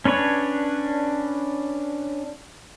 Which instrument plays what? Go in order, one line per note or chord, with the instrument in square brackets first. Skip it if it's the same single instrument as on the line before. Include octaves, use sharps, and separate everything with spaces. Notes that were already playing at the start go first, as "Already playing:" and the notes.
[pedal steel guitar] C#4 D4 B4 C#5